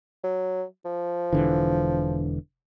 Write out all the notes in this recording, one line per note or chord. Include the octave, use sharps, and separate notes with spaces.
F#3
F3
E1 D3 E3